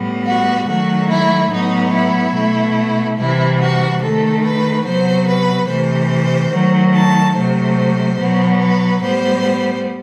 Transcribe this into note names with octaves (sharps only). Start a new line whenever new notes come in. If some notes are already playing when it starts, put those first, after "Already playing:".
Already playing: A2 G3 B3
F#4
D#3 F#3 A3 F#4
E4
A2 F#3 B3 D#4
E4
B2 A3
C3 E3 G3 E4
F#4
D#3 A3 A4
B4
C3 F#3 B3 C5
B4
C3 E3 A3 C5
D#3 F#3 A3
A5
C3 F#3 A3 C5
B2 F#3 B3
B4
A2 G3 B3 C5